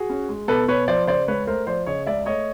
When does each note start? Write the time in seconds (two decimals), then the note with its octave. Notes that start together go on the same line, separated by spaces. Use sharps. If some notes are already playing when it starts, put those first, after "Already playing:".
Already playing: F#4 G#4
0.10 C#4
0.29 G#3
0.48 B2 A4 B4
0.68 B2 B4 C#5
0.88 F3 C5 D5
1.07 C#3 C5 D5
1.28 C#2 B4 C#5
1.47 A3 A#4 C5
1.67 F3 C5 D5
1.86 C#3 C#5 D#5
2.06 C#2 D5 E5
2.26 A3 C#5 D#5